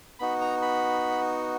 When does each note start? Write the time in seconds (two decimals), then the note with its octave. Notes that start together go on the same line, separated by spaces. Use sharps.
0.19 B3 D#4 F#4 B5
0.41 A#5
0.62 B5